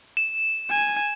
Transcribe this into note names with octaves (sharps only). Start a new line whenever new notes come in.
E7
G#5